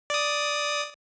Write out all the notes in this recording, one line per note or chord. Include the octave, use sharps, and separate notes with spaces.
D5 D#6